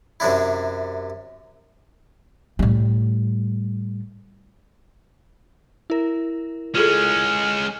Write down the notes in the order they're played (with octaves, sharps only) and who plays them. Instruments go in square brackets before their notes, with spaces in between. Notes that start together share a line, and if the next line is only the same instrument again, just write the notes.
[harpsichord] F#2 C3 D4 E4
[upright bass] A2 G3
[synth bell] E4 A#4
[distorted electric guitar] G#3 C#4 [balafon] F4 G#4 A4 [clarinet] F6